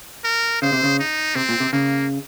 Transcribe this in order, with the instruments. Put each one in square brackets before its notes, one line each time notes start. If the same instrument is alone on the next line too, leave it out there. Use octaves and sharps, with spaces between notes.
[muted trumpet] A#4
[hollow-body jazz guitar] C#3 [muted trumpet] C5
[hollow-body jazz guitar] C3
C#3
[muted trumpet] D#4
[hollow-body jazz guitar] C3 [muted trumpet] C4
[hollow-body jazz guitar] A#2
C3
[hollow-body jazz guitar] C#3 [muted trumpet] A#3